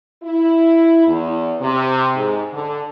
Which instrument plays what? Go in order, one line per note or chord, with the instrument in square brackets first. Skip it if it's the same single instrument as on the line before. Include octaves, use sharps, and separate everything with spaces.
[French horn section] E4
E2
C3
G#2
D3